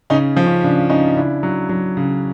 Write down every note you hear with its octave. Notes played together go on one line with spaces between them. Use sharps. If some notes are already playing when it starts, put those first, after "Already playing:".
C#3 C#4 D#4
F3
C#4
C#3 D4
C#3 C#4 D#4
C#3 D4 E4
F#3
F#3
C#3